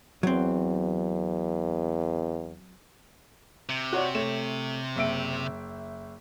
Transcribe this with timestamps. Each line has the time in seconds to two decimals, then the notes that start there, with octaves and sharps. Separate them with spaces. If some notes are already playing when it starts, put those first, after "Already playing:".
0.23 E2 F#3 C4
3.69 C3
3.93 F#4 C#5 D5
4.15 A3 C#5 E7
4.96 F#1 E5 D7